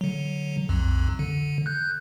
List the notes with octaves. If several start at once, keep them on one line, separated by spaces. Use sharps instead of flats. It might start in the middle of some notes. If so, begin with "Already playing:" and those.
D3 F#3
B1 F2
D3
F#6 G6